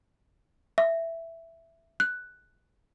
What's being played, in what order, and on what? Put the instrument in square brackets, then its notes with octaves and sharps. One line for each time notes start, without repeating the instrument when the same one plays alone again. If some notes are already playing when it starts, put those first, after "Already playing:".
[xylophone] E5
F#6